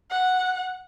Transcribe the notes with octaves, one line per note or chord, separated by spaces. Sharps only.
F#5